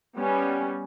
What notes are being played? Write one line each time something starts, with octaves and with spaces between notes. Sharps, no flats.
G3 B3 C#4